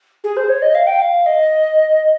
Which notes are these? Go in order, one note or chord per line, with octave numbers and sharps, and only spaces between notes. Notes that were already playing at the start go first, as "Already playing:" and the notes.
G#4
C5
C#5
D#5
F5
G5
F5
D#5